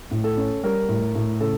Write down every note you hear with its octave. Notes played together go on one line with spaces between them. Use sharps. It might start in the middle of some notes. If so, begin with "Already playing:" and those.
A2
A4
C#4
G3 A#4
A2
A2
C#3 A4